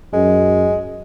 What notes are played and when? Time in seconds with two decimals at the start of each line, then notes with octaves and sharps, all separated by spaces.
0.13 F#2 G#3